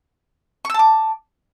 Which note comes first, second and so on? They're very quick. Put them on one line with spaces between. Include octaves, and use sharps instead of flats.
C#6 E6 A5 D6